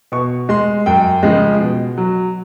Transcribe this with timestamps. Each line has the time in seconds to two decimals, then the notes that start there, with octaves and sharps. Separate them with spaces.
0.12 B2 C#6
0.49 G#3 C6
0.86 F#2 G5
1.23 C#3 F3 G#3
1.60 B2
1.98 F#3